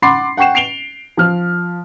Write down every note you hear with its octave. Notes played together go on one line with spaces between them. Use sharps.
F#5 B5 C6 D6 A6 C7
F#5 G5 C#6 C7 E7
C7 D7 F7 G7
F3 F6